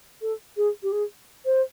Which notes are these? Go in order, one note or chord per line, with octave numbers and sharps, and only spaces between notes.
A4
G#4
G4
G#4
C5